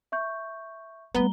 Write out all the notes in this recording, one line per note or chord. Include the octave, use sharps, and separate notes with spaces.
E5 C#6 G6
G3 A3 B3 A#5 G7